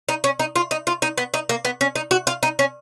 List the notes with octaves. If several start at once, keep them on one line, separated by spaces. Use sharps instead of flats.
D#4
C#4
D#4
F4
D#4
F4
D#4
B3
D#4
A#3
B3
C#4
D#4
F#4
F4
D#4
C#4